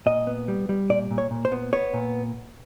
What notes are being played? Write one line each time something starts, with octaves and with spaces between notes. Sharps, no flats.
A#2 D#5
B3
G3
G3
A#2 D5
A#2
C#5
A#2
C5
B3
B3 C#5
A#2